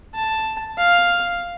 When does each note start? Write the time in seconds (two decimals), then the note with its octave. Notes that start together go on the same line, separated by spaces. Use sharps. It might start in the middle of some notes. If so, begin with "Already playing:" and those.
0.14 A5
0.78 F5